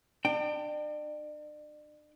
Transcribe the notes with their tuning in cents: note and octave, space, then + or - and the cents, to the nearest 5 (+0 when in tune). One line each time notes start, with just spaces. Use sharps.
D4 +40 G5 +0